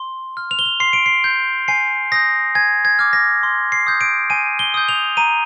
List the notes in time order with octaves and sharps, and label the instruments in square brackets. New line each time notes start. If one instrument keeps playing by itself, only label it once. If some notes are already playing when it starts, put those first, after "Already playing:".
Already playing: [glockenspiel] C6
F6
F7
G7
F7
C6 C7
D7
C7
G6
G#5 C7
D#6 G6 A#6
G#5 G#6
G#6
D6 F6
A#6
C6
C7
D#6 G6
D7
G#5 D#7
G7
D#6 G6
F7
A#5 D#7